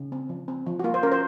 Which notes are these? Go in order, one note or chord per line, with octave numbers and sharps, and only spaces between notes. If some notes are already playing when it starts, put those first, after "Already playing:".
Already playing: C#3
C4
F3
C4
F3
F#4
A#3 F4
C5
C#4 A#4
C5